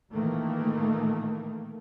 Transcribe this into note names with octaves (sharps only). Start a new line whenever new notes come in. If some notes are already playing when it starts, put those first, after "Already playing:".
A#2 D#3 E3 A3 A#3